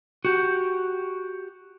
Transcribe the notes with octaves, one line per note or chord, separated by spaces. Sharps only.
F#4 G4